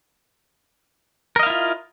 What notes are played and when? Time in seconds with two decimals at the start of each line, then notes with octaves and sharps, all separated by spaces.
1.36 A#4
1.39 D#5
1.43 F5
1.46 E4
1.50 F4